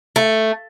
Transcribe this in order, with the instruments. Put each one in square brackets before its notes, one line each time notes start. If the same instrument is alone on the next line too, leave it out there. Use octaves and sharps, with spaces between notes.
[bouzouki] A3